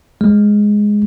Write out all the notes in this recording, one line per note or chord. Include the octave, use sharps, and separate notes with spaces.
G#3